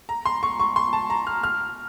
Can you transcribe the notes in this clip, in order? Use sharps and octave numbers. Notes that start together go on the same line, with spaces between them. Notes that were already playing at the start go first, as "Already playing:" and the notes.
A#5
C6
C#6
C#6
C6
A5
A#5
F6
F6